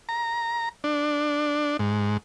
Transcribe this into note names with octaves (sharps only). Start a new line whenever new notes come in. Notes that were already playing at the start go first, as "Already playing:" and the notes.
A#5
D4
G#2